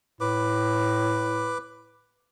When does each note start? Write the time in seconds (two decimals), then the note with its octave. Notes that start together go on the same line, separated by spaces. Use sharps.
0.21 A2 B4 D6